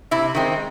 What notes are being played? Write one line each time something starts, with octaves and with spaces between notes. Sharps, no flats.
C3 E4
D#3 G#3 C4